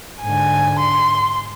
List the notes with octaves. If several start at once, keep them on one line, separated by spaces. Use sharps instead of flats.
G#2 D3 G#5
C6